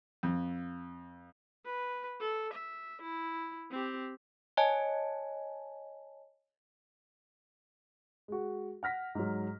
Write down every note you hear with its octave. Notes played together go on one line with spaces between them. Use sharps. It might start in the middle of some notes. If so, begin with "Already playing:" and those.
F2
B4
A4
E5
E4
C4 G4
C#5 D#5 G#5 A5
G#3 F#4
F#5 F6 A#6 B6
G#2 F#3